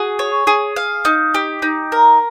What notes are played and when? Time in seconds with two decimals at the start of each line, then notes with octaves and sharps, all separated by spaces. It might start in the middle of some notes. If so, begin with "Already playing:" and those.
Already playing: F#4 G#4
0.19 C#5
0.47 G#4
0.76 F5
1.05 D#4
1.34 G4
1.62 D#4
1.92 A#4